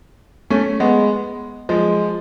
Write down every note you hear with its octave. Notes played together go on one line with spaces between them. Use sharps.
A3 C#4
G#3 B3
F3 G#3